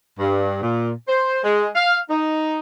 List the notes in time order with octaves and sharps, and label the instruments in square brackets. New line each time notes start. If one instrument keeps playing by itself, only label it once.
[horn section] G2
A#2
C5
G#3
F5
D#4